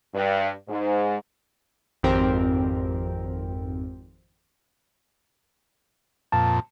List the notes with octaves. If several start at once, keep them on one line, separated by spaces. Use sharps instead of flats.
G2
G#2
G#1 F2 C4 G4 A#4
F2 A#2 A5